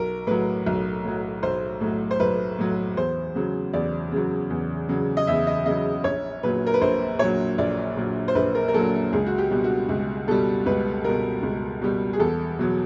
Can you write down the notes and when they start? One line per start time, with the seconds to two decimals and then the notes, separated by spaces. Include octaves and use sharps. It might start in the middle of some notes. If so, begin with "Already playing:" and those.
Already playing: B1 A#4
0.27 A2 F#3 B4
0.66 B1
1.05 A2 F#3
1.43 B1 C5
1.81 A2 F#3
2.11 C5
2.20 B1 B4
2.58 A2 F#3
2.97 E2 C5
3.35 C#3 F#3
3.73 E2 D5
4.12 C#3 F#3
4.50 E2
4.89 C#3 F#3
5.17 D#5
5.27 E2 E5
5.47 D#5
5.66 C#3 F#3 D#5
6.04 A#1 C#5
6.43 A#2 F#3 B4
6.67 A#4
6.74 B4
6.81 A#1 C5
7.19 A#2 F#3 C#5
7.58 A#1 D5
7.97 A#2 F#3
8.28 C5
8.35 A#1 B4
8.55 A#4
8.68 A#4
8.74 A#2 F#3 A4
9.13 C#2 G#4
9.26 F#4
9.38 G4
9.51 B2 G3
9.64 F#4
9.89 C#2
10.28 B2 G3 A4
10.66 C#2 B4
11.04 B2 G3 A#4
11.43 C#2
11.82 B2 G3
12.13 G#4
12.20 E2 A4
12.59 B2 F#3